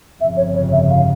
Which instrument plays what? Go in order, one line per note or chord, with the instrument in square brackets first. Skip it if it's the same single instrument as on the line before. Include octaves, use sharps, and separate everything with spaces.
[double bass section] G1 F2 C#3 [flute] E5
[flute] C#5
C#5
E5
F5